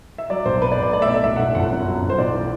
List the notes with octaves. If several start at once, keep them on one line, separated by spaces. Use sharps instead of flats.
E5
F#3 D5
B1 C5
B2 B4
D5
B1
D5
A3 D5
E5
B2 D5
B1 E5
F#5
B1 E5
G1 F#5
F#2
F#3
G1
C5
B1 D5
E3